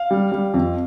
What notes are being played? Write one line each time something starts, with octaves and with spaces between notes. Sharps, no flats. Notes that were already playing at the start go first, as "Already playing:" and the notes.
Already playing: F5
G3
G3
F2